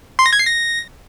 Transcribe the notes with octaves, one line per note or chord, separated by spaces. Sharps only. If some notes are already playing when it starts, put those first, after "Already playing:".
C6
A#6
G#6
C7
A#6